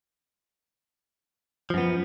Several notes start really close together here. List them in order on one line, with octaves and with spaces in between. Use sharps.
F3 F#2 B3